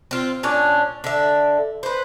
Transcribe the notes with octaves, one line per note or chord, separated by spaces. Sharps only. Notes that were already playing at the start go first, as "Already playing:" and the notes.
C4 F4
A#2 C#4 D4 C#5
D3 E5
B4 C5